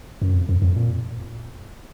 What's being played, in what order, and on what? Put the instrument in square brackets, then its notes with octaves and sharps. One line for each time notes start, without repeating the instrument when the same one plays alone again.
[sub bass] F#2
F2
F2
F2
A#2